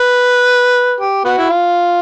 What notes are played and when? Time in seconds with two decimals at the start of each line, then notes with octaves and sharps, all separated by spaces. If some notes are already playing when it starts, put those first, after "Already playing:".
Already playing: B4
1.00 G4
1.25 B3 F#4
1.38 E4
1.49 F4